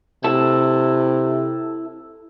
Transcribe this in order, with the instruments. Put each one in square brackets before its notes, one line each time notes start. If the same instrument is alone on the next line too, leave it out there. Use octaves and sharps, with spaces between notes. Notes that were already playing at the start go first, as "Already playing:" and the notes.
[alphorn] C3 [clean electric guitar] E4 A4